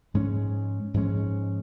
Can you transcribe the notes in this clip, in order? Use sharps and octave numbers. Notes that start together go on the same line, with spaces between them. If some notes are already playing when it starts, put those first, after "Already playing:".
G#2 F3 G#3 C#4
G#2 F3 G#3 C#4